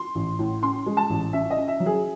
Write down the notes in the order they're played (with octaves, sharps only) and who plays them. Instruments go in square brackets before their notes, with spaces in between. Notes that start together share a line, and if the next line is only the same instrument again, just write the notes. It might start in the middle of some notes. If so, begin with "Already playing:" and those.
Already playing: [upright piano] C6
A1
A2
C#4 C6
G#3
A5
A1
C#4 E5
D#5
C#4
E5
F#3
G#4